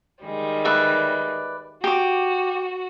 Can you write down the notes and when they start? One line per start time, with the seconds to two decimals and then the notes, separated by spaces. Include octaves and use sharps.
0.24 D#3 G3 G#3
0.65 B4 D5 E5
1.84 F#4 G4 D6